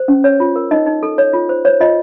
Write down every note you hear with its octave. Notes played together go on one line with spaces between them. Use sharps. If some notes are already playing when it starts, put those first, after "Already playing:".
Already playing: C5
C#4
C#5
F4
A#4
D#4 D#5
D#4
A4
C#5
F4
C5
C5 C#5
F4 D#5